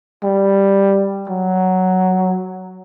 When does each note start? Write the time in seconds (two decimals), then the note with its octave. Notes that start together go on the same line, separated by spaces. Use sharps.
0.23 G3
1.29 F#3